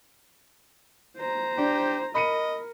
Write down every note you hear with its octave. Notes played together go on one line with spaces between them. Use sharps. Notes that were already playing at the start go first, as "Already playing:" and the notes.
C5 A#5
D4 G4
A#4 D#5 B5 C#7 D#7